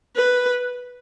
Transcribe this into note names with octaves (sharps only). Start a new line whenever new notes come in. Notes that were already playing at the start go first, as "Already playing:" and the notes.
B4